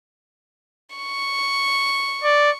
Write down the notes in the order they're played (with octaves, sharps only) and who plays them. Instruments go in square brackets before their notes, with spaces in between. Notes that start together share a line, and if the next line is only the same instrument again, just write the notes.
[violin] C#6
[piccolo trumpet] D5